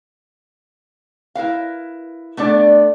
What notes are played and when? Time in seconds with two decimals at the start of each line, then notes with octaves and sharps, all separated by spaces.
1.35 E4 A#4 B4 F5
2.37 A3 B3 D4 D5